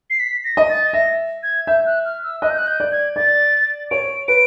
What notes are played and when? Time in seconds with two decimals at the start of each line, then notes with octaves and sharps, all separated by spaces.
0.10 C7
0.20 B6
0.44 A#6
0.57 D#5
0.69 A6
0.93 E5 A#6
1.43 G#6
1.67 E5 G6
1.86 F#6
2.05 F6
2.24 E6
2.42 D#5 F#6
2.51 G6
2.58 F#6
2.67 G6
2.80 D5
2.92 G#6
3.16 D5 A6
3.91 C#5 D7
4.28 B4 D7